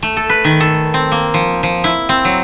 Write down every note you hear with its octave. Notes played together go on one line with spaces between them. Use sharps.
A3
A4
B4
D#3
A4
C4
A#3
F3
F3
E4
C4
F#3